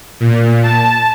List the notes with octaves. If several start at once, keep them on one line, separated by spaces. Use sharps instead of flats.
A#2
A5